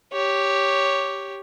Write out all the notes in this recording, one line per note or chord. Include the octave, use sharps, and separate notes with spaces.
G4 C#5